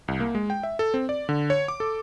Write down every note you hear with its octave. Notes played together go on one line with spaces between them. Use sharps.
C2
A#3
G#3
G5
E5
A4
C4
D5
D3
C#5
D6
A4